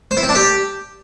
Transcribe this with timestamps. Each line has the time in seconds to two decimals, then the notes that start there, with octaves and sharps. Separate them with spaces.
0.11 C5
0.17 E4
0.23 C4
0.29 D4
0.35 G4